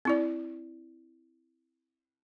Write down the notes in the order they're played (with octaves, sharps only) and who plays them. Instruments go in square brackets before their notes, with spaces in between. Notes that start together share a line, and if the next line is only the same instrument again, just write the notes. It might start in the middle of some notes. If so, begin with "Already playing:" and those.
[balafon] C4 E4 D5